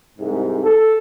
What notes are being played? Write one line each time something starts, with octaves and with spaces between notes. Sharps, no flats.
C2 G#2
A4